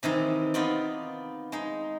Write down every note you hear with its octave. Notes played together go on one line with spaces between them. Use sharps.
C3 D#3 E3 D#4
B3 D#4 F4 D5
G#3 D#4